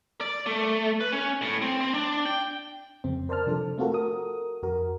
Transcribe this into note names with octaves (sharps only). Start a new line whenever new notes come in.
D5
A3
B4
C#4
A2
C4
C4
D4
G5
F2 C#3 C4
A#4 C5 D5 A5 F6
C3 F3 D4 A4
A3 C4 F4 F#4 A4 A#4
F#4 A4 A#4 D#6
F2 F#4 A#4